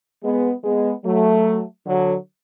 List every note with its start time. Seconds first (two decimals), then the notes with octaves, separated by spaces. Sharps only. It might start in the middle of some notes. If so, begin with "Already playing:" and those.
0.23 G#3 B3
0.64 G#3 B3
1.05 F#3 A3
1.86 D3 F#3